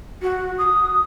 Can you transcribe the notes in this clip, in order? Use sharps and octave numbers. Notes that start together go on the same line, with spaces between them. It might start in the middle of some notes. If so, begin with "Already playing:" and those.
F#4
D#6